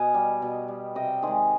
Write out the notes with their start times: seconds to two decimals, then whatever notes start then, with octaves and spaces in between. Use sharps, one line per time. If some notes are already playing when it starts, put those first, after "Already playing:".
Already playing: B2 D#5 F5 G#5
0.14 G3
0.42 B2
0.68 G3
0.95 C3 D#5 G5
1.22 D#3 G#3 G#4 C5